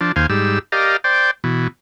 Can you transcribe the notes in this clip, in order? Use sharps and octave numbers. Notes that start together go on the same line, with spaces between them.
F3 D4
D#2 C5 F5 G#5
G#2 G3 E6
G4 A#4 D5 D#5 F5
C5 D5 G5
B2 E3